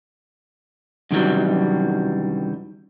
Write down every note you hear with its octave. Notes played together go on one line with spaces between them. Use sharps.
F#2 C3 D#3 E3 F#3 G3